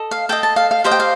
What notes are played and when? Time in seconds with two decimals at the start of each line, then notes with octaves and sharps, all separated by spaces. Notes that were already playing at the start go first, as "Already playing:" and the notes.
Already playing: A4 D#5
0.11 F5
0.29 A4 D#5 G5
0.43 A5
0.56 F5
0.71 F5
0.84 G4 C5 D#5 F5
0.91 G5
1.00 F5